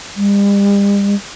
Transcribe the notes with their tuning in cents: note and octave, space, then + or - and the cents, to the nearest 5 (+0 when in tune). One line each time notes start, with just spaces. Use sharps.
G3 +45